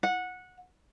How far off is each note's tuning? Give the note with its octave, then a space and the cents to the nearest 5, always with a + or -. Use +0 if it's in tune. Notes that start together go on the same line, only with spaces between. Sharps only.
F#5 -15